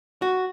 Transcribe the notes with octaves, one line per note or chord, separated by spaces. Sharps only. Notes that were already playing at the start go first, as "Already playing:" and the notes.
F#4